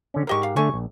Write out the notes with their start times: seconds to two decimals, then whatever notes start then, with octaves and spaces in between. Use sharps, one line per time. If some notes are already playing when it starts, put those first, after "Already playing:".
0.14 D3 C#4
0.27 G#2 D3 G4 A#4 D#5 C#6
0.43 F5
0.56 D3 A3 G#5 C#6
0.74 A#1